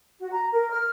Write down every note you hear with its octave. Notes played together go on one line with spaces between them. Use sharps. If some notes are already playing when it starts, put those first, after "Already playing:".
F#4
A#5
A#4
F6